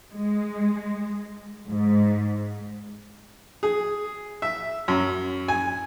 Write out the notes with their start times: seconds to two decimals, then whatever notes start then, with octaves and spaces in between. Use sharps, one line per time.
0.16 G#3
1.71 G#2
3.63 G#4
4.42 E5
4.88 F#2
5.48 G#5